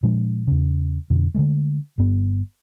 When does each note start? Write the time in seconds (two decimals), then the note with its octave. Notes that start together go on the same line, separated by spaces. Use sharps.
0.03 A#2 F3 G#3 D4
0.47 E2 C#3
1.10 F2 B2 D3
1.34 D3 E3 G#3 A3
1.98 G1 G2 B3